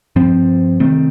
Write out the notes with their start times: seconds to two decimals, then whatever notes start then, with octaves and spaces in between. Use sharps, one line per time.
0.16 G2 F3 C4
0.80 C3 D#3 A3 C4